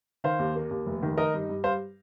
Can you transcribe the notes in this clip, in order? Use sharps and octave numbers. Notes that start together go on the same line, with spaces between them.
D#3 C5 F5
D#2
A#3
D#2
F1
D#3
D#4 A#4 D#5
G2
G2
G2 C5 F5